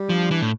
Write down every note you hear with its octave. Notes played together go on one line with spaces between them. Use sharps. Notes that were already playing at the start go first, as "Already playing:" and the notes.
Already playing: G3
F3 D4
E3 D4
A2